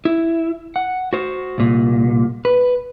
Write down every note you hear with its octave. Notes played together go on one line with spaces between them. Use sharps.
E4
F#5
F#4 C5
C2 A#2
B4